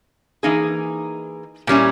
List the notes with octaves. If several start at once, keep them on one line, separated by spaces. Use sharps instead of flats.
E3 A#3 D#4 G#4
A#2 G3 C#4 E4